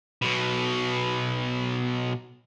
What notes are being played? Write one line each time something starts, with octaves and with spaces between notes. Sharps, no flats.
B1 B2